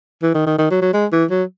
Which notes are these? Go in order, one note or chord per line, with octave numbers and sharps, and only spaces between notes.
E3
D#3
D#3
D#3
F#3
F#3
G#3
E3
F#3